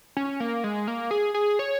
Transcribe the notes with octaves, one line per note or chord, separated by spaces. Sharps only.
C#4
A#3
G#3
A#3
G#4
G#4
C#5